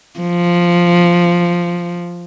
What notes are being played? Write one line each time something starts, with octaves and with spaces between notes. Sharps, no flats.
F3